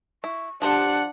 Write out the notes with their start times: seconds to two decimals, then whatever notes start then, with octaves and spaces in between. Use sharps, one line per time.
0.24 E4 C#6
0.62 F3 D4 G4 C5 F#5 A5